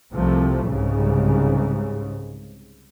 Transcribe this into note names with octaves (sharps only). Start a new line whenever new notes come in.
C2 C3 F3 A3
C2 G#2 C#3